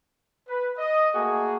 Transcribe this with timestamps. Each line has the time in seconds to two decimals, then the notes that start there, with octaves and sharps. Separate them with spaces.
0.48 B4
0.77 D#5
1.14 A3 A#3 F#4 G#4